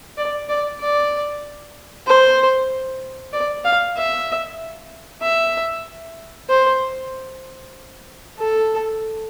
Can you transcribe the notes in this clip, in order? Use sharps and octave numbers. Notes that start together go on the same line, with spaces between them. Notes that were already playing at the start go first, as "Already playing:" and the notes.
D5
D5
D5
C5
D5
F5
E5
E5
C5
A4